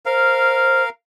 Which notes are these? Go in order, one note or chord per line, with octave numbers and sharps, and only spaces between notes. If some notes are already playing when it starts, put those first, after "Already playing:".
A#4 C5 F5